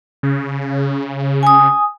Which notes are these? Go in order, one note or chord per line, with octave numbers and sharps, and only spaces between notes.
C#3
G#5 D#6